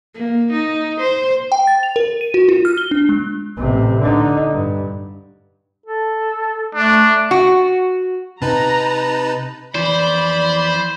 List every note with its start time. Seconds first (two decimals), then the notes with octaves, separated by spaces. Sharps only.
0.14 A#3
0.52 D#4
1.00 C5
1.52 G5
1.67 A6
1.83 F7
1.96 A#4
2.21 D#7
2.34 F#4
2.49 F4
2.65 F6
2.78 G7
2.91 D4
3.09 G#3
3.57 A1 C3
4.00 D3 D#4
4.53 G2
5.86 A4
6.75 A3 D4
7.31 F#4
8.42 C3 D#4 B4 A5 A#5
9.75 F2 E3 C5 D5 B5